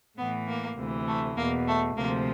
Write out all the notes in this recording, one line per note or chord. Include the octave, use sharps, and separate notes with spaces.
A2 E3 B3
A#3
D2 C3 E3
A3
E2 B2 A#3
A3
D2 C3 F3 A#3